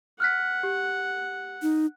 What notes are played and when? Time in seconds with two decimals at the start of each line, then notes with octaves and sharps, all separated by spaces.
0.20 F#5 F6 F#6 B6
0.63 G4
1.62 D#4